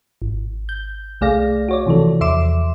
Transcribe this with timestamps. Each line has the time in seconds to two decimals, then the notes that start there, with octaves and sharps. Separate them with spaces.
0.22 G#1
0.69 G6
1.21 C2 A3 G#4 D5 F5 A#6
1.69 F#4 C#5 D5
1.86 C3 E3 F3 A4
2.21 E2 E5 C6 D6 E7